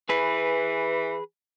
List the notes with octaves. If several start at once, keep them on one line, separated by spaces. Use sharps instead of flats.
E3 G#4 B4